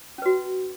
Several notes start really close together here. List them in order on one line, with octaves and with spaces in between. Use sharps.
C#4 B4 F#4